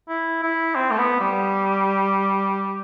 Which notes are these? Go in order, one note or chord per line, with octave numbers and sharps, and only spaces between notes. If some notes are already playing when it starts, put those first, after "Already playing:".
E4
E4
C4
A3
B3
G3